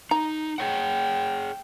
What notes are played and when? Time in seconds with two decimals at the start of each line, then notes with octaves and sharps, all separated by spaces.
0.11 D#4 A#5
0.58 G#4 C#5 F#5 G5